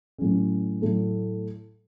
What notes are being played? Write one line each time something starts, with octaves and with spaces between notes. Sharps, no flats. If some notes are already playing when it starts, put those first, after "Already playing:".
A2 F#3 C#4
A2 F#3 A3